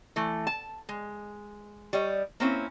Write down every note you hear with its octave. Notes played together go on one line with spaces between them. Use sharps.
E3 A3
A5
G#3
G3 C#5 D#5
A#3 C4 C#4 D#4 E4